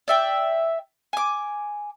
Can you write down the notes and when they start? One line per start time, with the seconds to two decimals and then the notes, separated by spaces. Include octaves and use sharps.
0.08 D5 E5 G5
1.13 G#5 D6